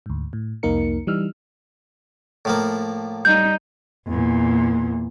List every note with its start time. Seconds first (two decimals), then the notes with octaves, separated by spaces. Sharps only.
0.06 D2 G#2
0.33 A2
0.63 C2 F2 A#3 D#4 A#4 C#7
1.07 E3 G3 D#4 E6 F6
2.45 A2 F3 A#3
3.25 G3 D#4 G6
4.07 E2 A#2